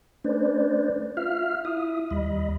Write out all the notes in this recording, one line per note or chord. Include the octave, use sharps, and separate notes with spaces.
A3 C#4 D4 B4 C5 D5
F4 E5 F5 F6
E4 E5 D#6
D#2 G3 D#5 B5